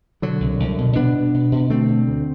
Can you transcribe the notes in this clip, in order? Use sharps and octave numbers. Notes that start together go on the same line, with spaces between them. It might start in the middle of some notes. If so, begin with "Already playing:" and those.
B2 D3 F#3
C2
C2
B2
B2 B3 D4
B2
B2
B2
D3 A3 C4
D3
D2